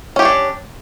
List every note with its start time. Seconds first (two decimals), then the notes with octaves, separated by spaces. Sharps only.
0.16 C#4
0.19 G4
0.22 C#5
0.25 D4